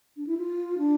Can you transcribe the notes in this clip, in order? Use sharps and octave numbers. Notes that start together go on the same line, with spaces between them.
D4
E4
F4
D4